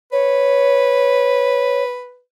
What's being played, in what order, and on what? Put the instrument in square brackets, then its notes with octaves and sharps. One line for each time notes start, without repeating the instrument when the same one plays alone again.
[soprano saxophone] B4 [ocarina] C#5